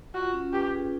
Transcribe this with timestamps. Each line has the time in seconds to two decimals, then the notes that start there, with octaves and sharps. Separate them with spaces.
0.14 F4 F#4
0.33 C#4
0.53 G4 B4
0.72 G#4